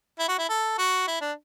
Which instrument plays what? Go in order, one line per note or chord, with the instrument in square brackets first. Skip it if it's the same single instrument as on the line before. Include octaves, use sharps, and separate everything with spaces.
[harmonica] E4
F#4
E4
A4
F#4
E4
D4